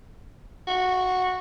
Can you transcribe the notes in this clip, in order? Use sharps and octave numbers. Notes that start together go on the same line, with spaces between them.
F#4